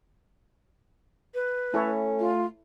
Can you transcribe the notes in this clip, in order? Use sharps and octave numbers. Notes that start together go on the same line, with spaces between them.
B4
A3 C#4 E4 A4 C#5
F4